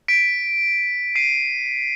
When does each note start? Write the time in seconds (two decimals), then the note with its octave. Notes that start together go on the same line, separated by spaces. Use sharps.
0.08 B6 D7
1.15 C7 D#7